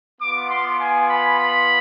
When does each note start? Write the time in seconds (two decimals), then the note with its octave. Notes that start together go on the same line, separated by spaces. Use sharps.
0.20 B3 F4 D6
0.51 C6
0.79 G#5
1.08 B5
1.38 B5